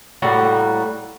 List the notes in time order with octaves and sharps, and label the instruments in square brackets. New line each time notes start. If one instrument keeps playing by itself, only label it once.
[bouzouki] A2 G3 A#3 F#4